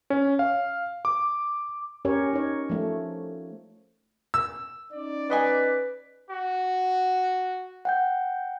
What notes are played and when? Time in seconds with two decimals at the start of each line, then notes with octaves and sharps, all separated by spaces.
0.10 C#4
0.39 F5
1.05 D6
2.05 C#4 G4 A#4 C#5
2.33 D#4 C#5
2.70 F3 A3
4.34 E6
4.93 C#4 D#4 D5
5.30 G3 B4 D#5 G#5
6.30 F#4
7.85 F#5 G5 G6